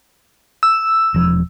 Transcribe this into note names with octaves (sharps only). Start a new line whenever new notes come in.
E6
E1 F3